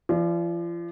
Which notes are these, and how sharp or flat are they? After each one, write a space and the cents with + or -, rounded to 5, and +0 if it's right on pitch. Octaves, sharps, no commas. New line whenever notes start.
F3 -40 D5 +0